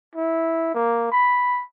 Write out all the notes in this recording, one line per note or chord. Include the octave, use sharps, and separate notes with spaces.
E4
A#3
B5